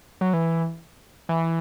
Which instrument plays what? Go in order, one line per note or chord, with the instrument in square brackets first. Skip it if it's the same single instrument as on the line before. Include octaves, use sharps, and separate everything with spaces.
[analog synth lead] F#3
E3
E3